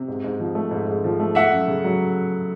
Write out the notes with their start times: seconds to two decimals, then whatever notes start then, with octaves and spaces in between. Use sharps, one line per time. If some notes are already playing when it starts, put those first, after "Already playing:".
Already playing: C3
0.08 G#2
0.24 G#2
0.40 F3
0.55 A3
0.71 G#2
0.87 G#2
1.04 F3
1.20 A3
1.35 A3 E5 F#5
1.51 F#2
1.67 C#3
1.84 F#3